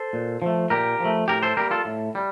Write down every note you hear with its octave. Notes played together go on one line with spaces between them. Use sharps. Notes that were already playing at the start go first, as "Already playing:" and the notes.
Already playing: A4 C5
A#2
F3 A3
A#2 G4 A#4
F3 A3
A2 G4 A#4
A4 C5
G3 A#3 G4 A#4
F4 A4
A2
G3